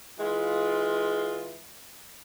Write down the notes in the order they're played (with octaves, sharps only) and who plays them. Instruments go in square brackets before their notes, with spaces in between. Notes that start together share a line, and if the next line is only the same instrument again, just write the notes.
[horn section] E3 G#3 F4